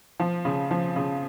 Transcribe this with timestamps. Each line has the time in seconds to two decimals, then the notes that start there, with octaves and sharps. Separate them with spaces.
0.20 F3
0.45 C#3
0.71 F3
0.96 C#3